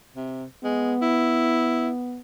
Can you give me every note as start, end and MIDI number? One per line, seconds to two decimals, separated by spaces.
0.16 0.45 48
0.64 0.94 56
0.64 2.20 59
1.02 1.89 64